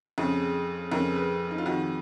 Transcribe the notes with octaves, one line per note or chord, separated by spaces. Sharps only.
F2 C#3
F2 C#3 A#4
B4
D#4
F4
F2 D#3 F#4